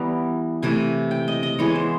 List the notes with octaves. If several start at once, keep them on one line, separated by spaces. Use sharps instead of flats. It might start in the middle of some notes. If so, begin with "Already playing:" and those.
Already playing: E3 G3 B3 A#5
C3 E3 A3 G#5
G5
D#5
D#5
E3 G#3 B3 C#5
C5